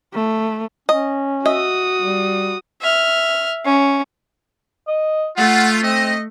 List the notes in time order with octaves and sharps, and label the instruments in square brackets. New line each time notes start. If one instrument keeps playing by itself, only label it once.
[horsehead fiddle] A3
[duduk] C#4 [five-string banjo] D#5
[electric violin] F#4 D#6 [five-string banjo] D#5 E5
[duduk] G3
[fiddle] E5 F6
C#4
[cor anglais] D#5
[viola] A3 [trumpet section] F4 [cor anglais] F#5
[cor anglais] C4 [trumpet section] D#5